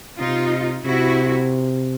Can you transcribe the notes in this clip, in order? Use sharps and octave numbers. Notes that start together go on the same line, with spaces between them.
C3 D#4 F4
C3 E4 F#4